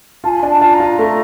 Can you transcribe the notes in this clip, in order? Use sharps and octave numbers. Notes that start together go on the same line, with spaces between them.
F4 G#5 A5
D4
A5
F4
A#5
F4
A3